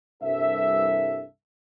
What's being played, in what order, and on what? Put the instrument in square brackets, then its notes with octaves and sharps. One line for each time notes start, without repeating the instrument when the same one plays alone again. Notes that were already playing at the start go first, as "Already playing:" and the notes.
[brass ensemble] C2 G2 E3 A4 E5